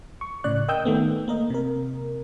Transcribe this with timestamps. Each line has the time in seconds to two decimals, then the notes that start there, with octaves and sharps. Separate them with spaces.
0.21 C#6
0.44 A2 C#3 D5 F#6
0.68 A#4 D#5 G5 D#6 E6 G6
0.85 D#3 A3 B3
1.28 A#3 A#4 D#5
1.50 C3 A#4